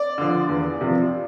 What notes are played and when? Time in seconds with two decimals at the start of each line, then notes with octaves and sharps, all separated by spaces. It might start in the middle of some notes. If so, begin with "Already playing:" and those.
Already playing: D5
0.18 D3 F3
0.49 E2
0.81 C3 F3